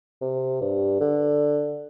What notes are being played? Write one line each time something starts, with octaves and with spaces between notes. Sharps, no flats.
C3
G2
D3